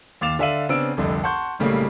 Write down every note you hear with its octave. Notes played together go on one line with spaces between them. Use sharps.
D#2 F5 D6 A6 E7 F7
D3 D5 E5 F5 D#7 F#7
C#3 B3 C4 D4 E6 D7
F1 C2 F2 D3
F#5 A5 C6 C#6 G6
B1 A2 C#3 G3 A3 A#3